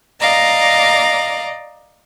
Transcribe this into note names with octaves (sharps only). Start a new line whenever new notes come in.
D5 D#5 F5 A#5